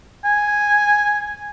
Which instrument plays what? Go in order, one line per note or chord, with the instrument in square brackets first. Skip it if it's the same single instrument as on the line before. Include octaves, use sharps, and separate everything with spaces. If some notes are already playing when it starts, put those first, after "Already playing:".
[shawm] G#5